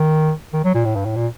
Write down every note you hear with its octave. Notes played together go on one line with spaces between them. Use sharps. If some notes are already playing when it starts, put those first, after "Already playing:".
Already playing: D#3
D#3
F#3
A#2
A2
G2
A2
A#2